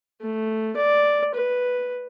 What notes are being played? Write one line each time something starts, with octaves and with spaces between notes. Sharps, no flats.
A3
D5
B4